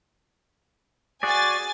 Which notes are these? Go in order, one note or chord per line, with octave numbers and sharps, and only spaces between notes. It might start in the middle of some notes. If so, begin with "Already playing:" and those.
F#4 G#4 D5 G#5 A6